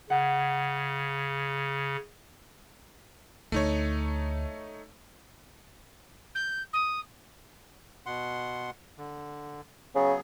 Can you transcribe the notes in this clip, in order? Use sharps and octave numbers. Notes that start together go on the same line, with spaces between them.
C#3 F#5
D2 A3 D#4 C#5
G6
D#6
B2 F#5 C6
D3
C#3 F#3 B3 G#4